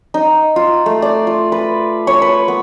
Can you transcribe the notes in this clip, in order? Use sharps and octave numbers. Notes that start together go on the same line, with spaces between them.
D#4
F4
A3
D5
F4
B4
C#5
B4
B3